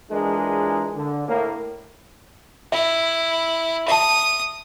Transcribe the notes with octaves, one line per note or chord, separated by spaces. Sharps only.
A#1 E3 G#3 D4 G#4 A#4
D3
A2 A#3
E4 E5
E5 A5 D#6